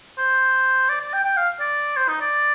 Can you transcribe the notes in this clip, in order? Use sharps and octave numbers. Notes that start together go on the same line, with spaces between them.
C5
D5
D5
G5
G5
F5
D5
C5
D#4
D5